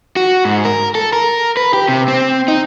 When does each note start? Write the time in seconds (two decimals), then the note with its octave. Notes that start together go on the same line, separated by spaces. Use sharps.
0.16 F#4
0.45 G#2
0.65 A#4
0.95 A4
1.13 A#4
1.57 B4
1.74 G4
1.88 C3
2.08 C4
2.48 D#4